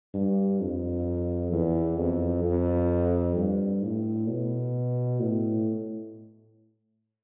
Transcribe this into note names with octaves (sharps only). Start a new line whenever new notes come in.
G2
F2
E2
F2
F2
G2
A2
B2
A2